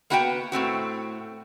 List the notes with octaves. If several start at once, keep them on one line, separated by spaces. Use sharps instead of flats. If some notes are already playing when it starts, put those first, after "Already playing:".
A#3 B3 F#4 B4 F#5 G5
A2 A3 C4 F#4